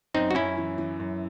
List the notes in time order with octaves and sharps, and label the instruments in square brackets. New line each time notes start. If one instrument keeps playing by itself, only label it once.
[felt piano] F#2 [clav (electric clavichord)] C4 D#4
[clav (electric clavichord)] F#4
[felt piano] F#2 [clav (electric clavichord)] C#4 E4
[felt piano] E3
E3
F#2